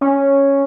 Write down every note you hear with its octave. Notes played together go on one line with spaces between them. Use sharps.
C#4